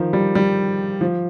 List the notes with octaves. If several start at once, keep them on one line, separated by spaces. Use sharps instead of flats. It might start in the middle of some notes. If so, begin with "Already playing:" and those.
Already playing: D#3 F3
G3
G3
F3